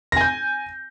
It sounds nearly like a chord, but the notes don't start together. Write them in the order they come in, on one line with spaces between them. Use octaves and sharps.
A#6 G#5 G6